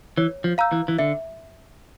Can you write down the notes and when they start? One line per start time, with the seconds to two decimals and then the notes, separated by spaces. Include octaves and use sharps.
0.18 E3 C#5
0.44 F3
0.58 F5 A#5 E6 G6
0.72 E3
0.88 E3
0.99 D3 E5